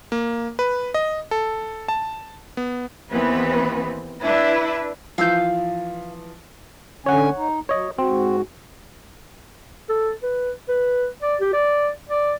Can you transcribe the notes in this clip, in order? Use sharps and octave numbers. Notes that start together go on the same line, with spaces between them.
A#3
B4
D#5
A4
A5
B3
D#2 E3 B3 C4 B4
D4 E4 B4 E5
E3 F3 F5 E6 G6
D3 C#4 C#5 F#5 G#5
D#4
F#3 C#5 D#5
G#2 C4 F#4
A4
B4
B4
D5
G4
D5
D5